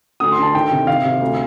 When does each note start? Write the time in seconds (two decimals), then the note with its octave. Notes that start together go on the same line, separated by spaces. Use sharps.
0.20 D2 D#6
0.32 C6
0.38 D3 A5
0.54 D#3 G5
0.71 C3
0.87 D#3 F5
1.05 C3
1.21 D2